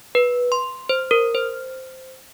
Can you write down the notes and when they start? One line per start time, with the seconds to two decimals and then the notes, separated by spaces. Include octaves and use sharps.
0.15 B4
0.52 C6
0.89 C5
1.11 A#4
1.35 C5